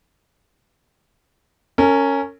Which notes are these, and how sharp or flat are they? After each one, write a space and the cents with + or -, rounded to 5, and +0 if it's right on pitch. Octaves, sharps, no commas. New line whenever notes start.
C#4 +0 A#4 -30